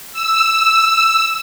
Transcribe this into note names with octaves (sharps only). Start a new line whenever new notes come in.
E6